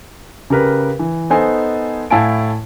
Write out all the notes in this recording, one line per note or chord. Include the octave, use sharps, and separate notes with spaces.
C#3 G4 A#4 B4
E3
B3 D#4 A4 C5 D#5 G#5
A2 E4 F5 G#5 A5 D7